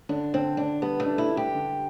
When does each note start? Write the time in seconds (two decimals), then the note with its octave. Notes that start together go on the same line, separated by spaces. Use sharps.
0.09 D3 D4
0.34 D3 C4
0.57 D3 D4
0.82 G3 B3
1.00 A3
1.06 D4
1.18 E4
1.31 D4
1.37 G4
1.55 D3